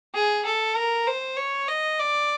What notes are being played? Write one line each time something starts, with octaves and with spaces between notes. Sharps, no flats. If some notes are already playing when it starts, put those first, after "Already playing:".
G#4
A4
A#4
C5
C#5
D#5
D5